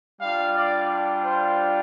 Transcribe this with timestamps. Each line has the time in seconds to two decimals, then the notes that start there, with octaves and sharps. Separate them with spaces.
0.21 G3 D4 F4 F5
0.57 D5
1.25 C5